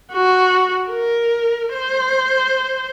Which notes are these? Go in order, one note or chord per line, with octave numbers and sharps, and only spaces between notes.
F#4
A#4
C5